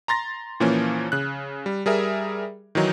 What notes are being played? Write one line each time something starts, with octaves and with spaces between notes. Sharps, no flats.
A#5 C6 A6 A#6
A#2 E3 F3 A#3 C#4
C#3 F#6
G3
G3 G#4 A#4 E5
D#3 E3 F#3 D#4